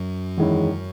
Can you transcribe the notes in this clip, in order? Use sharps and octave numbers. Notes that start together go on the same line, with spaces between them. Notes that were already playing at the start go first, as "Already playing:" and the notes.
Already playing: F#2 F#3
E2 D#3 G#3 C#4 E4